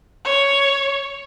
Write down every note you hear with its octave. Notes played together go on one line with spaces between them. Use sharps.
C#5